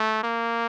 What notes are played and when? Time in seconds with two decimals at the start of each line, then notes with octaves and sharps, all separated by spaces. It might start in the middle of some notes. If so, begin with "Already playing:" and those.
Already playing: A3
0.24 A#3